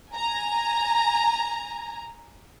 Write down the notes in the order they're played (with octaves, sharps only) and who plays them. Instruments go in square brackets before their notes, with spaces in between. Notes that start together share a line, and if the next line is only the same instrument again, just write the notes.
[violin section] G#5 A#5